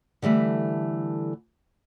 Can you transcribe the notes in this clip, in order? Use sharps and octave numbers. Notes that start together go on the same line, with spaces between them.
D3 E3 G3 A3